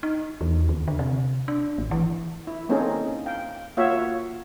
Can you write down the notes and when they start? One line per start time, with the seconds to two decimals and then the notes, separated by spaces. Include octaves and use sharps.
0.03 D#4
0.41 E2
0.69 D#2
0.88 D3
0.99 C3
1.48 D4
1.78 G#1
1.91 E3
2.47 E4
2.69 A#3 C4 C#4 D#4 G#4 A4
3.26 F5 G5
3.77 A#3 F4 F#4 C#5 E5 F5